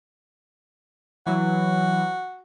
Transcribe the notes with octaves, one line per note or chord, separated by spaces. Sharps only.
E3 F#3 F#4